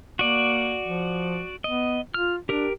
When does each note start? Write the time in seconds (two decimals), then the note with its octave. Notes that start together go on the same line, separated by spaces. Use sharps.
0.19 A#3 F#4 D5
0.85 F3
1.64 B3 D#5
2.14 F4 F6
2.49 D4 G4 A#4